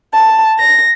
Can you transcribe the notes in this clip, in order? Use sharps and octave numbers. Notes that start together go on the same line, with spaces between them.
A5
A#6